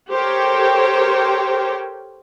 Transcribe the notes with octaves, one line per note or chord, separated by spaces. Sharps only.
G4 A4 A#4 C5 C#5 G5